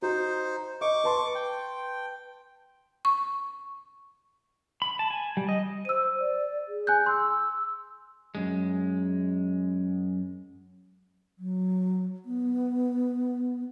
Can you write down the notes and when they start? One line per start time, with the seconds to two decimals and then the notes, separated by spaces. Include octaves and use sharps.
0.02 D#4 F#4 C5
0.81 D#5 C#6 D6
1.04 B4 A5 C6
1.35 G5
3.05 C#6
4.82 B5
4.99 A5
5.10 G#5
5.37 G3
5.49 D#5
5.85 C5 E6 D#7
6.19 D5
6.68 G#4
6.87 G#5 F#6 G6
7.06 C6 E6
8.35 F#2 G#3
11.38 F#3
12.25 B3